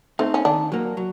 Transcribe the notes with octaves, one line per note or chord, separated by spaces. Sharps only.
A3 C4 D#4
C#4
D#3 D4
F#3 A#3
F#3